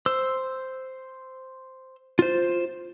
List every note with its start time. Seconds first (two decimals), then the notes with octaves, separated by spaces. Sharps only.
0.06 C5 E6
2.19 F4 C5